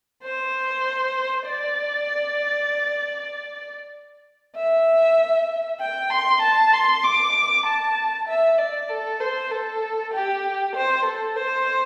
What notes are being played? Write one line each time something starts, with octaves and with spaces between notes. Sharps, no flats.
C5
D5
E5
G5
C6
A5
C6
D6
A5
E5
D5
A4
C5
A4
G4
C5
A4
C5